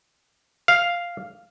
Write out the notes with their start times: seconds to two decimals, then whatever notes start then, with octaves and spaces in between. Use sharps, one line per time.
0.68 F5